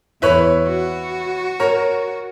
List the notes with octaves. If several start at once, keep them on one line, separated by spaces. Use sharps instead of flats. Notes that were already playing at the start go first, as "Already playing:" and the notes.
E2 E4 B4 C#5
F#4
A#4 C#5